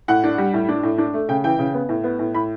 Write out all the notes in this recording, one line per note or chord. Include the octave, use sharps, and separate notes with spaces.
A2 F#5
D4
G3
A2
D4
A2
D4
A3
C#3 G5
E3 G5
C#3
B3
A2
B3
A2
A2 B5